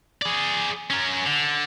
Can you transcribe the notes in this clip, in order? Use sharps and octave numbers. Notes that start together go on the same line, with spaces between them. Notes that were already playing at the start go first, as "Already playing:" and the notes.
G#4 D5
C#4 A#4
D3